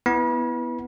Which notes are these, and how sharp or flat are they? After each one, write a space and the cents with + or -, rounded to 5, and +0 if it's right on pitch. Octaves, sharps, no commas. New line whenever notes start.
B3 +0 E4 +0 B5 -35